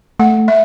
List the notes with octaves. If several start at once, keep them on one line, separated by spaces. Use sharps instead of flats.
A3 F#5
E5